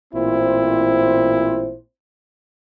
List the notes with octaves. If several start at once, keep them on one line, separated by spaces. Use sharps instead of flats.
A1 A#2 C4 E4 C5